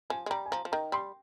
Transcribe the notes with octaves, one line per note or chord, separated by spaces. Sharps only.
F3 G#5
G#3
G3 A#5
G#5
F3 A#5
F3
D#3 A#5
G3 C6